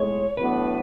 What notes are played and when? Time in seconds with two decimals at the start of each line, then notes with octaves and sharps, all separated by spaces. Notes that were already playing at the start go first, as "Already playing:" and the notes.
Already playing: B1 A2 G#3 C#5
0.37 A1 A2 F#3 B3 D4 B4